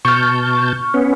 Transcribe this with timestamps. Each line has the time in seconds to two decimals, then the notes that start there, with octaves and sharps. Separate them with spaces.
0.05 B2 A5 C#6 F6 G6
0.94 B3 C#4